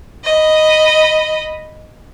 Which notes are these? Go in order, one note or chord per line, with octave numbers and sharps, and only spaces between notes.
D#5 B5